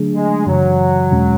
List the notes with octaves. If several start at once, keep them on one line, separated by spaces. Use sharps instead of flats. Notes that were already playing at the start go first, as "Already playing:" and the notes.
Already playing: D3 F#3 A3 D4 G#4
G#3
F#2 C#3 E3 F#3
E2 B2 G#3 C#4